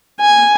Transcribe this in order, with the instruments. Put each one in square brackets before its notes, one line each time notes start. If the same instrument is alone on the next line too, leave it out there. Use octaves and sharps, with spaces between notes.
[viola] G#5